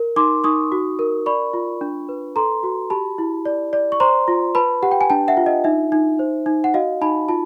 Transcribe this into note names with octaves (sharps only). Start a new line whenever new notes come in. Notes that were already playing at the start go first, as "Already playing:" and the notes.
Already playing: A#4
D#4 C6 D6
D#4 C#6 D#6
F#4
A#4
D5 B5 C#6
F4
D4
B4
A4 A#5 C6
F#4
G4 A5 B5
E4
D5
D5
C#6
C5 A#5 C6
F4
B4 A5 B5
G4 F#5
G5
G#5
D4 G5 A5
E5 F#5
F4
D#5
D#4 E5
D#4
C5
D#4
F#5
F#4 D#5 F5
D#4 A5 B5
F4 A5 B5